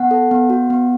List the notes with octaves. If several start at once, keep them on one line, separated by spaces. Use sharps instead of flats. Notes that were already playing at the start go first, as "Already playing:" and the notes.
Already playing: B3 F#5
A4
B3
F#4
B3